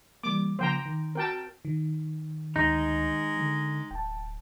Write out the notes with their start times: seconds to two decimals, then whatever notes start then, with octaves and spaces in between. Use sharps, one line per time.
0.23 E3 G3 A#3 D6
0.59 C#3 F3 A#3 C5 G5 A#5
0.86 D#3
1.15 C4 F#4 A#4 G5 A5
1.65 D#3
2.56 D2 G#3 D#4
3.37 D3
3.91 D1 G5 A5